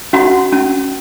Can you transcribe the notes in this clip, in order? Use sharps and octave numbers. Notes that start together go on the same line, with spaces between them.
C#4 F#4 F#5
C#4